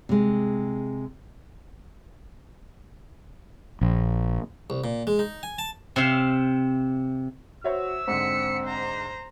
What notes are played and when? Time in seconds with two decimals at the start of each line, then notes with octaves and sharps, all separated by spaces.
0.09 C3 G#3
3.81 A#1
4.70 C2
4.84 A#2
5.07 G#3
5.19 D#4
5.43 G#5
5.59 A5
5.96 C3 C4 E5 F5
7.64 F#4 C5 C#5 E5 E6
8.08 G#2 D3 C4 B6 C#7
8.64 C5 A#5